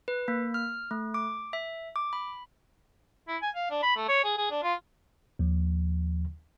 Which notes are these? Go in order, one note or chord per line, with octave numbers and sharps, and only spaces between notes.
B4
A#3
F6
A3
D6
E5
D6
B5
E4
G#5
F5
D4
B5
A3
C#5
G#4
G#4
D4
F4
D#2 F3